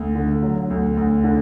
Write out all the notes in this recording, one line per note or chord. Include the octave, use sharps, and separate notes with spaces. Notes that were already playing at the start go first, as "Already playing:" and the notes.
Already playing: D2
D3
F#3
D2
D2
D3